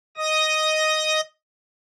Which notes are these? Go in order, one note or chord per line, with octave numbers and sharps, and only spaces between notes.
D#5 D#6 A#6